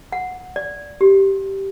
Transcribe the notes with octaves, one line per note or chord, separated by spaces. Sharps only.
F#5
D5
G4